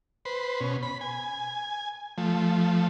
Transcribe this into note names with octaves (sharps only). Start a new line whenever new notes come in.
B4 C5
B2 C#4
B5
G#5
F3 A3